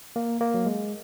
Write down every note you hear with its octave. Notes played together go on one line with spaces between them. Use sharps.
A#3
A#3
F#3
G#3